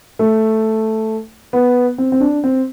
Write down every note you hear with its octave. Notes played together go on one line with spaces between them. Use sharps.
A3
B3
C4
C4
D4
C4